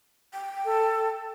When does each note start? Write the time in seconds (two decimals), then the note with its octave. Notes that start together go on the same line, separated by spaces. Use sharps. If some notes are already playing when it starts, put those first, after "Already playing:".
0.33 G5
0.65 A4